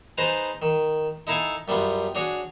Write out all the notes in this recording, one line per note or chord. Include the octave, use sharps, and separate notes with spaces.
D#4 G#4 B4 C5 A5 A#5
D#3
D#4 E4 A4 F5 G#5 A5
F#2 G3 B3 F4
D4 F#4 G#4 C#5